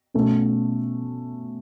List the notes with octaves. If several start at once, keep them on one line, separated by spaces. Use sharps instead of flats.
B2 A3 C#4